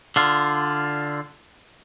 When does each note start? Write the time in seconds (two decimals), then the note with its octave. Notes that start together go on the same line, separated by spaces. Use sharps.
0.16 D3 F4